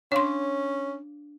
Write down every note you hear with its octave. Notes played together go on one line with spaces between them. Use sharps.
C#4 D4 C#5 F5 C6